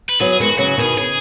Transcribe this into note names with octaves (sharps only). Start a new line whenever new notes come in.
B4
F#3 B3 G#4
D#3 G#3 F#4
G#3
C#3 F#3 F#4
B2 D#3 G#4
C#3 G#4